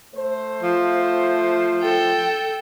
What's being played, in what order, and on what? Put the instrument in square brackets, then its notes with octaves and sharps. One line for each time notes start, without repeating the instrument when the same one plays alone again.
[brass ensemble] A3 C5
[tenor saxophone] F3
[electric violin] A4 G5